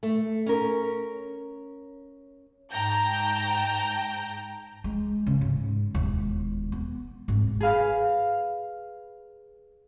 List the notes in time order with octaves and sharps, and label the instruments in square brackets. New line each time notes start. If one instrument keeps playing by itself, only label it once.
[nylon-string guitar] A3
C#4 A#4
[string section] G#2 G5 A5 A#5 G6
[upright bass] G#3
C#3
G#2
E1 D#2
B3
G#1 G#2
[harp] G#4 B4 F5 F6